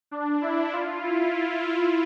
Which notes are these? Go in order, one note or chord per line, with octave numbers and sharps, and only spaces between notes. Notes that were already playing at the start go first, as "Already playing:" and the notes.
D4
E4
F4
E4